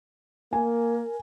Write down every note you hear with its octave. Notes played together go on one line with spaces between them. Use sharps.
A#3 A#4 G#5